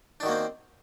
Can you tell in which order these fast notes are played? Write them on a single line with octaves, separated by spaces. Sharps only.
D4 D#3 F#4 A#3 C4